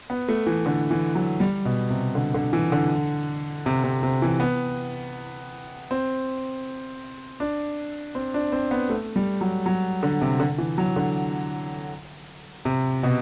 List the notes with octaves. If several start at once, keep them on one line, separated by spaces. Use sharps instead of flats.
B3
A3
E3
D3
E3
F#3
G3
B2
C3
D3
D3
E3
D3
C3
C3
C3
E3
B3
C4
D4
C4
D4
C4
B3
A3
G3
F#3
F#3
D3
C3
D3
E3
F#3
D3
C3
B2